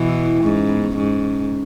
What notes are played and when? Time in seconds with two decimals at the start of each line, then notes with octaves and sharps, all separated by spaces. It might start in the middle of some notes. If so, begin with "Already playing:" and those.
Already playing: B2 E3
0.09 E4
0.26 E4
0.43 G#2 C#4
0.57 C#4
0.70 B3
0.83 C#4
0.97 G#2 C#4